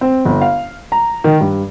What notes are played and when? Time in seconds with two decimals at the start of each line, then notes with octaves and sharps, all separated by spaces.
0.01 C4
0.25 G1
0.41 F5
0.92 A#5
1.24 D#3
1.41 G2